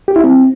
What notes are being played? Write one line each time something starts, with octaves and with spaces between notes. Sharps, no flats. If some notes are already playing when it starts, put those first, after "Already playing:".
G4
E4
C4